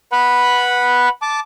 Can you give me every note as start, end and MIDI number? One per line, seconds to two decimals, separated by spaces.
0.12 1.09 71
0.12 1.09 78
0.12 1.09 83
1.22 1.40 81
1.22 1.40 86